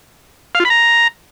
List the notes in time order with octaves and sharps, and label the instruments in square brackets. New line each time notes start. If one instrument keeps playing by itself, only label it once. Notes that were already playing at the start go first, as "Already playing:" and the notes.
[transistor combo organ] F5
F4
B5
A#5